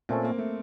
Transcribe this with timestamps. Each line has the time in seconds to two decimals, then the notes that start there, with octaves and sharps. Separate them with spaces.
0.09 A#2 A3 C4 C#4 A4
0.25 A#3
0.38 A3